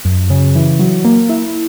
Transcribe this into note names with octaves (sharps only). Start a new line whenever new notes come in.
F#2
C#3
E3
F#3
A#3
E4